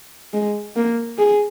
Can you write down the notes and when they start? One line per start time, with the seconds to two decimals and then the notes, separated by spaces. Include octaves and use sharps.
0.33 G#3
0.76 A#3
1.18 G#4